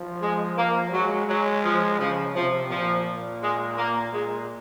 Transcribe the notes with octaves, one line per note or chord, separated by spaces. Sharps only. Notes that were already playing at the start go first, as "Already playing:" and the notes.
Already playing: F3
G#3
A#3
F#3 G#3
F#3 G#3
F3
C#3 F3
C3 F3
A#2 F3
A#2
G#3
A#3
A#2 G#3